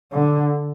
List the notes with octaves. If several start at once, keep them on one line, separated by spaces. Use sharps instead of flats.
D3